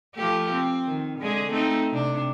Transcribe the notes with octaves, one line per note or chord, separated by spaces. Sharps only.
F3 A3 G4
C4
D#3
D3 G#3 G#4
A3 C4 D#4
C3 D4